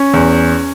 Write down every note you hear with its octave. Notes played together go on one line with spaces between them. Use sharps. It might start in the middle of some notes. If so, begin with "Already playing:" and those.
Already playing: C#4
E2